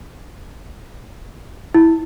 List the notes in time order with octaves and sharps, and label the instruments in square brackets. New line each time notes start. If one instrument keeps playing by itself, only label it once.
[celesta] E4